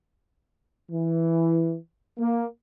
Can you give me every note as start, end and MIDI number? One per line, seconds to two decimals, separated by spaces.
0.92 1.77 52
2.19 2.45 58